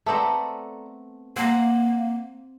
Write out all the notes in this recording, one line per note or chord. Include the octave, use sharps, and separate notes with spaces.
A3 B3 C4 A4 D5 A#5
A#3 C4 F#5 A#5